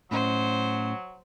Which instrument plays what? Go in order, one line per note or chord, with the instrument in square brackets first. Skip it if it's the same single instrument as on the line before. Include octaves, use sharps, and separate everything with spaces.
[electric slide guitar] A2 C#4 D#5 [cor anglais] F#3 [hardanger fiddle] C5